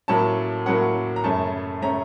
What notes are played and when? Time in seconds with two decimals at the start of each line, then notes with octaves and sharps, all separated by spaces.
0.08 A2 F#3 A#3 C#4 A5
0.66 A2 F#3 A#3 C#4 F#5
1.16 A#5
1.24 F#2 C#3 A3 C#4 A5
1.82 C#3 A3 C#4 A#5